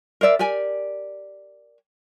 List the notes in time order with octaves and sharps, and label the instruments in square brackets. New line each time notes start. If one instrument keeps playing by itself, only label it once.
[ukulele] A#4 C5 D5 E5
G4 A#4 D5 G#5